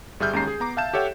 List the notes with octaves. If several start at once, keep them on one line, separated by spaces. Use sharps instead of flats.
G1 G3 G#4 E5 F6 G6
D#2 G#3 C#4 G4 A#5 C7
G#4
B3 A#5 D6
E5 F5 A5 G6 E7
G4 A4 C#5 E5 F#5 G5